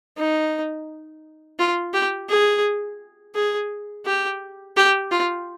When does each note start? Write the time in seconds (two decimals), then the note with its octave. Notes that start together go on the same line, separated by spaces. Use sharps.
0.18 D#4
1.59 F4
1.94 G4
2.29 G#4
3.35 G#4
4.06 G4
4.77 G4
5.11 F4